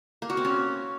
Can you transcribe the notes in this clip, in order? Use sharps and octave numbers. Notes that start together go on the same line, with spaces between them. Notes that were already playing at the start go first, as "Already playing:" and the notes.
A#3
F#4
C4
C#4